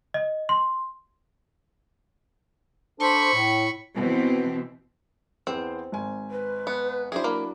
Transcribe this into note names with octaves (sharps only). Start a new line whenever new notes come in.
D#5
C6
D4 A4 C5 B5 C#6
A2
B2 E3 C4
E2 B3 C4 C5
G#1 G#5
B4
B3
F#3 D4 E4 G#4 C5 E5
A#3 B5